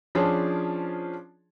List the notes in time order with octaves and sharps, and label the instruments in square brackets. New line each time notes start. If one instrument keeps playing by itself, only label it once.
[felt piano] F3 C#4 D4 F4 G#4 A5